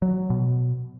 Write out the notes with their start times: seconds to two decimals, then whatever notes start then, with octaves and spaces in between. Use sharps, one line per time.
0.02 F#3
0.30 B2